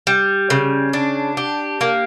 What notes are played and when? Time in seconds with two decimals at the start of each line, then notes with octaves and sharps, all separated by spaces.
0.07 G3
0.50 C#3
0.93 D4
1.37 G4
1.81 A#3